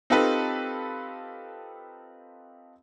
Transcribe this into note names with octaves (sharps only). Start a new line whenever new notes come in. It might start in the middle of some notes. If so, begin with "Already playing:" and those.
C4 D#4 F4 G4 A4 B4